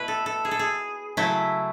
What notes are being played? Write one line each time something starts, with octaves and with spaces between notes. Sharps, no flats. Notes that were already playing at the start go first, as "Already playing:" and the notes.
Already playing: B2 A3 E4 B4
A4
A4
G#4
A4
G#4
C#3 F#3 A3 E4